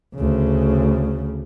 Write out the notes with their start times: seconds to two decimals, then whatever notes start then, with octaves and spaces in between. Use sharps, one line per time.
0.15 D2 C#3